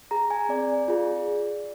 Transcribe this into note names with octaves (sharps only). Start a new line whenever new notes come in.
G#4 A#5
G#5
C4 D5
F4 G#4